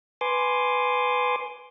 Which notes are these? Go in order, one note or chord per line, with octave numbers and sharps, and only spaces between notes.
B4 G#5 C6 D6